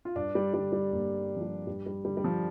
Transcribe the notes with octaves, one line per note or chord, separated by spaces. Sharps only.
F4
G2 D4
G3
D3 G3
G3
G2 A#3
D3
F3
G3
G2 G3
G3
D3 G3
G3
F3